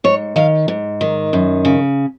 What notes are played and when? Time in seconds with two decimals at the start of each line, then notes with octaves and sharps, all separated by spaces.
0.04 G#2 C#5
0.36 D#3 F5
0.68 G#2
1.01 D#3
1.33 F#2
1.65 C#3